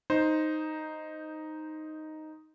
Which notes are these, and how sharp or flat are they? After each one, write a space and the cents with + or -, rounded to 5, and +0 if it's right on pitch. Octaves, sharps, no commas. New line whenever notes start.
D#4 +0 C5 +0